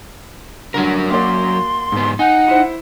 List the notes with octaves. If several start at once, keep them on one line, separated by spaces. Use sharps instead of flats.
D2 G2 F#3 A#4
A#3 F#4 D5 C6
G#2 B3
D#4 F#5 G#5
E4 C5